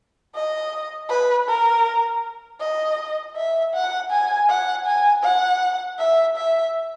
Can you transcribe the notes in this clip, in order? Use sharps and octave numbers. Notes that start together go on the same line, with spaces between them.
D#5
B4
A#4
D#5
E5
F#5
G#5
F#5
G#5
F#5
E5
E5